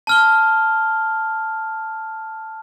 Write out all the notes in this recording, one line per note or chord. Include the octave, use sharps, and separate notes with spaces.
A5 F6 G7